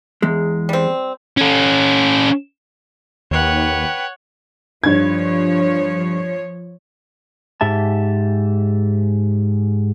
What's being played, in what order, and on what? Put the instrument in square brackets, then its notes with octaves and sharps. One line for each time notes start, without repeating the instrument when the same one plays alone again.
[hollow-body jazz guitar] E2 G#3
[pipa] G3 C4
[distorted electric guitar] C#4 A4
[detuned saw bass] D#2 [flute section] B4 G5 [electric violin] C#5 F#5
[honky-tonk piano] G2 G#6 [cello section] F3 C#5
[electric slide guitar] G#2 G4 E5 A5